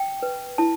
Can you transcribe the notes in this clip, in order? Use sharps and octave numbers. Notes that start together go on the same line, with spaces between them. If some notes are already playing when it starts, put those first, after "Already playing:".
Already playing: G5
B4
E4 A5